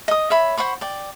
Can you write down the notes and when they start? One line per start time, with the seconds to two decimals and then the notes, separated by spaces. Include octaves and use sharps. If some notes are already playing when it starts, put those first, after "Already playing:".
0.08 D#5 D#6
0.30 C#5 E5 B5
0.57 C5 F#5 B5 C#6
0.81 D5 G5